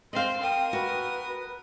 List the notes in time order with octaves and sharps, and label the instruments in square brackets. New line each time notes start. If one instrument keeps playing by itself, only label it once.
[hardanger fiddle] C4 C5 [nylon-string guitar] D#5 F5 [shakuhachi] C6
[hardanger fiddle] A#4 D#6 [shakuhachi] G5
[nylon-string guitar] F#4 [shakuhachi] B4